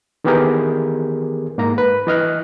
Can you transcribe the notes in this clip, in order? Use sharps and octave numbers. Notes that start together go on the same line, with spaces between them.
D#3 E3 B3 G4 G#4 A#4
G#2 A#3 A#5
B4
E3 D#5 F6 F#6